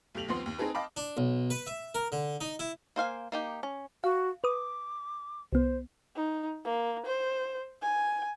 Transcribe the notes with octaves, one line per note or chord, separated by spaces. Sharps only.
B1 A3 G4 F7 F#7
D#2 F3 B3 C4 C6
D#2
C4 D#4 G#4 A4 B4
D#5 F5 G5 A5 B5 D6
D4
B1
B4
E5
A#4
D3
D#4
E4
A#3 C5 F5 G#5
A#3 D#4 G4
C#4
F#4 F5
B4 D6 D#6
C2 B3 C5
D#4
A#3
C5
G#5